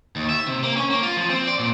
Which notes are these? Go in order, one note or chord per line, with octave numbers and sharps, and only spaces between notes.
D#2
E5
C3
A#3
C#4
A#3
F4
F3
C4
D5
A#2